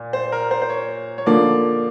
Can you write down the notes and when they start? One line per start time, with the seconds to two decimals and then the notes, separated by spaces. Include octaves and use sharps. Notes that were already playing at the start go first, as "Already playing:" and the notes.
Already playing: A#2
0.13 C5
0.32 A#4
0.51 C5
0.62 C5
0.70 C#5
1.18 C#5
1.26 D3 F3 A#3 D5